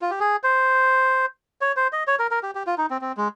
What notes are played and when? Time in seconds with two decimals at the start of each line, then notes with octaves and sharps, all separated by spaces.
0.02 F4
0.10 G4
0.20 G#4
0.44 C5
1.61 C#5
1.77 C5
1.93 D#5
2.07 C#5
2.19 A#4
2.31 A#4
2.43 G4
2.55 G4
2.67 F4
2.78 D#4
2.90 C4
3.01 C4
3.17 G#3